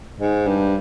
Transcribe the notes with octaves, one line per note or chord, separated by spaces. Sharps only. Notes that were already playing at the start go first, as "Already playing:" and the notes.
G#2
G2